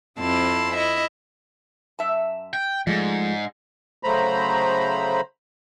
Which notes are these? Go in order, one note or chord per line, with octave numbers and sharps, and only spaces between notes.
F2 C4 E4 A5 C6
E4 D#5 E5
F#2 E5 A5
G5
G#2 F3 G#3 A3 D5 D#5
C#3 F#3 A3 C5 A#5 B5